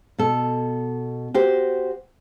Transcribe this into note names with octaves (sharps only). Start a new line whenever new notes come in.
B2 A4
F#4 G4 C5